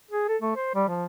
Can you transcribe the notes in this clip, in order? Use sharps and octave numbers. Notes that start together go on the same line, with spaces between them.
G#4
A4
A3
C5
G3
F3